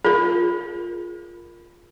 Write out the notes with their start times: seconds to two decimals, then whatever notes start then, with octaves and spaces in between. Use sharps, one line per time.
0.05 F4 G#4 A#4